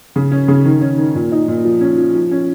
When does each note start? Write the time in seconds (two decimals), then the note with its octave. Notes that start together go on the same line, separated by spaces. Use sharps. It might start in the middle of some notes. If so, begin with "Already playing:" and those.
0.16 C#3
0.31 C#4
0.48 C#3
0.65 D#3
0.81 C#4
0.98 D#3
1.15 A#2
1.32 D#4
1.48 A#2
1.65 F3
1.81 C#4
1.98 F3
2.15 F3
2.31 C#4